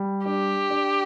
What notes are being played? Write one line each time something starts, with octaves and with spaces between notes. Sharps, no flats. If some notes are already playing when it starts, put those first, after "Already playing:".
Already playing: G3
D4 G4
D4